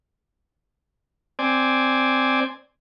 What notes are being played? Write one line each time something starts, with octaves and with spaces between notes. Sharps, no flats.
C4 D5 G#5